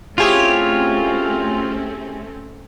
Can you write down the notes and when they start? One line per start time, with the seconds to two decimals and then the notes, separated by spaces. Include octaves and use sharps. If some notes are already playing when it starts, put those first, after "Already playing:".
0.18 A3 C4 C#4 E4 F4 G4 G#4 C#5